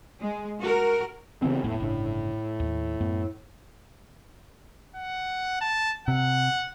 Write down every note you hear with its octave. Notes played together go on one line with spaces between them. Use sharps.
G#3
F#4 A#4
C#3 E3 B3 C4
E1 A2 A3 B3
G1 C#3 D4
D#2
F#2 A3 B3
F#5
A5
C3 F#5